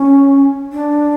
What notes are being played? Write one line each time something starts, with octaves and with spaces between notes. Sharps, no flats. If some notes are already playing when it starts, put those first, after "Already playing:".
Already playing: C#4
D4